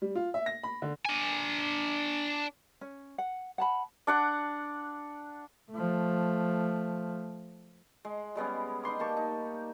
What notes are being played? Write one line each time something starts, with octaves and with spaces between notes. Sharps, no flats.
G3
F4
E5
A#6
B5
D3
D4 G#5
C#4
F#5
F#5 A5 B5
D4 F#5 D6
F3 A3
G#3
G3 G#3 B3 C#4
D#4 B4 C6 D6
A#3 G4 A5 C#6
D#4